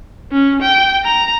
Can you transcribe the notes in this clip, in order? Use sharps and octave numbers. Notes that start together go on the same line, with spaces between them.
C#4
G5
A#5